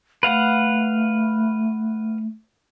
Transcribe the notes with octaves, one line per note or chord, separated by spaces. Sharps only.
A3 B4 F5 F#5